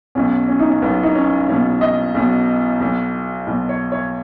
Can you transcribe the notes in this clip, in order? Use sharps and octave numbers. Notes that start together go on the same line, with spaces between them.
B1 B2 C#4
C#4
D#4
C#4
B1 B2 B3
D#4
C#4
B1 B2 C#4
D#5
B1 B2
B1 B2
B1 B2
C#5
C#5